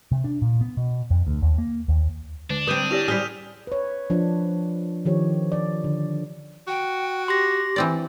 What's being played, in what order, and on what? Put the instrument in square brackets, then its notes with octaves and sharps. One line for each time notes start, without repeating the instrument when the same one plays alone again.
[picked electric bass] C3
D4
A#2
B3
B2
F2
D2
D#2
A#3
D#2
[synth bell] D3 [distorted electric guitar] D4
[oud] C4 B4 [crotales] D#6 G6 D#7
[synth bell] E4 G4 D5 [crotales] A#6 E7 F7
[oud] G3 C4 G#4 [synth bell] E6 B6 [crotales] F6
[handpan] B4 C#5
F3 D4
D#3 F3 G4 C#5
D5
D3
[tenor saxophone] F#4 [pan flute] G5
[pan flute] G4 [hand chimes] C6 A#6
[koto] E3 C4 D5